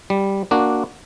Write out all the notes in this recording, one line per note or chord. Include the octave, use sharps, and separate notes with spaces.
G3
A#3 D4 F#4